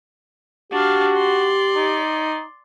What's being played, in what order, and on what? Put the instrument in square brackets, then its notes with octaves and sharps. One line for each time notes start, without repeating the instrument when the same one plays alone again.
[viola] D4 F5 [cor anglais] F#4 [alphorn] G4
[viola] D5 C6
[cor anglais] D#4